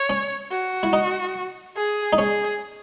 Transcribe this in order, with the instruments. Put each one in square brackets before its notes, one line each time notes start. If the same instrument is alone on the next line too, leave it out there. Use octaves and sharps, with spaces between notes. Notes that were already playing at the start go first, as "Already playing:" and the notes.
Already playing: [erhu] C#5
[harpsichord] C#4
[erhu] F#4
[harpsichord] E4
D#4
[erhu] G#4
[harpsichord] D#4
[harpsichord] C#4 [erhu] G#4